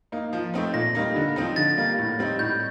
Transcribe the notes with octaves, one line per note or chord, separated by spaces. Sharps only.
A#3 D#4
F3
A3 C4 D#4
A#2 A#6
G3 A#3 D#4
D3
F3 C4 D#4
D3 A6
G3 A#3
A2
G3 C4 D#4
A2 G6